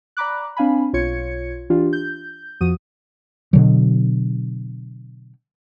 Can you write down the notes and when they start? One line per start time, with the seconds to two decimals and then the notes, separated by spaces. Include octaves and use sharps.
0.17 D5 A#5 B5 D6 F#6
0.57 C4 D4 F5 G#5 B5
0.93 B1 F4 C#5 G#6 C#7
1.70 E3 D4 F4 G4
1.93 G6
2.61 F2 F3 F#4 D#6 D#7
3.53 B2 D3 F#3